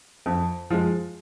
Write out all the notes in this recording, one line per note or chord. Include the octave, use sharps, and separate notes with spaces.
F2
F3 G#3